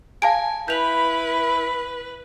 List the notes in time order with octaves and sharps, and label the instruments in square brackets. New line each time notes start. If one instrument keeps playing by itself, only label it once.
[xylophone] F5 A5 D7 [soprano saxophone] G#5
[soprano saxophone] E4 [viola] B4 [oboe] B5 [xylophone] G6 F7